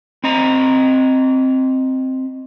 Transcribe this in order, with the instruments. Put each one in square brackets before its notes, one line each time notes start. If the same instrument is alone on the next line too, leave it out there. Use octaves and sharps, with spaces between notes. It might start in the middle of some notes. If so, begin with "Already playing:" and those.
[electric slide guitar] C4 D#5 A#5